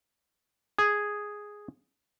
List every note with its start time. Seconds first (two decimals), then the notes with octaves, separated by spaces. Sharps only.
0.79 G#4